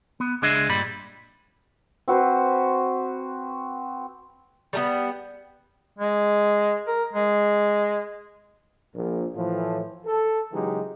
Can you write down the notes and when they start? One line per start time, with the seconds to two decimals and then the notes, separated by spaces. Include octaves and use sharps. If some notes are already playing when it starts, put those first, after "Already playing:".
0.20 B3
0.42 C#2 G#3 D4 G#4 D#5 E5
0.69 G2 A#2 G3 B5
2.08 C4 F#4 B4 C5
4.73 G3 A3 B3
5.99 G#3
6.88 A#4
7.13 G#3
8.95 A#1 A#2
9.35 A2 E3 F3
10.06 A4
10.52 C#3 E3 F#3 G#3 D#4 G4